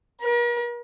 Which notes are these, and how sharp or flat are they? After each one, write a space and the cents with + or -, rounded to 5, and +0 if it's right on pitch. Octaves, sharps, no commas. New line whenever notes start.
A#4 +45